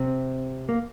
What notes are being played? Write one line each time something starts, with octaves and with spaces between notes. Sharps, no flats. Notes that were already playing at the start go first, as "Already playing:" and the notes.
Already playing: C3 C4
A#3